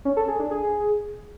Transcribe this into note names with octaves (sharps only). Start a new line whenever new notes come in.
C#4
A4
G#4
D4
G#4